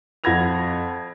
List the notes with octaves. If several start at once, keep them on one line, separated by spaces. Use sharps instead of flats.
F2 F#5 B5 G#6 A#6 F7